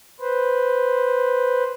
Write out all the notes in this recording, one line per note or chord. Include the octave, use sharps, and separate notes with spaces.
B4 C5